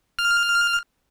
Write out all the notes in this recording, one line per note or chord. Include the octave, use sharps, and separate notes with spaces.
F6